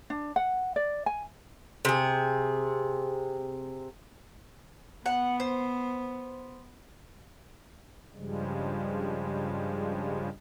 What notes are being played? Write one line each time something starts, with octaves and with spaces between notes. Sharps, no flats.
D4
F#5
D5
G#5
C3 G#4
B3 F#5
C5
G2 C#3 F3 G3 G#3